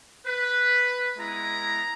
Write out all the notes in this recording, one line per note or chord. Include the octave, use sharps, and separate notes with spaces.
B4
G#3 B3 E4 A#5